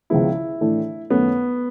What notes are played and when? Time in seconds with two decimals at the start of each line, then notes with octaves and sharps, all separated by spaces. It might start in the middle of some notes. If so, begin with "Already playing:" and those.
0.10 C#2 C#3 F3 G#3 B3 E4
0.61 A2 E3 A3 D4
1.10 F#2 D#3 F#3 A3 B3 C#4